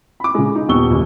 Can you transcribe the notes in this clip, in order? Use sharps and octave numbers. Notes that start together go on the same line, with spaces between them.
B5 D6
C#3 G#3
D#4
D#1 B3 C#6 E6 G7
F#1 D#2